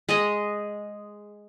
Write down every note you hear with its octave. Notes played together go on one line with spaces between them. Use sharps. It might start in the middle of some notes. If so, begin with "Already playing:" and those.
G#3 G#4 D#5